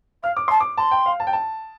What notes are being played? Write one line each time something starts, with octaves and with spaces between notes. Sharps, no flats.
F5 F6
D6
A5 C6
D6
A5 C6
G5
F5
A5
G5
A5